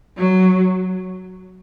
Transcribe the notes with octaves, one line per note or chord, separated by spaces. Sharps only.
F#3